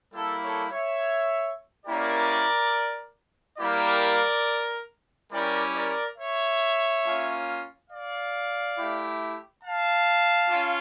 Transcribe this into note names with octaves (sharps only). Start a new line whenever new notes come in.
G3 A#3 E4 A4
A4 C#5
C#5 E5
A#3 C#4 E4 G4 A#4 D5
G3 A#3 E4 G4 A#4 D5
G3 C#4 E4 G4 A#4 D5
A#4 D5
C#5 E5
A#3 C#4 F4
D5 F5
A3 E4 G4
F5 A5
C#4 F4